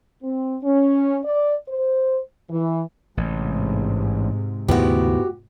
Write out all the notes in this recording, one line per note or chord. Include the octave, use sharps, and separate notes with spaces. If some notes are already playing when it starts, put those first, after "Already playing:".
C4
C#4
D5
C5
E3
A1 G#2 C3
D#2 G#2 C#3 A3 B3 E4 F#4 G4